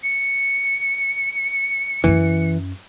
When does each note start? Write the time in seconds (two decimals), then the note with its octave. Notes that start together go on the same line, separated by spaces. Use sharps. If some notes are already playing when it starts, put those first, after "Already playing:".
0.03 C#7
2.04 F#2 E3 C#4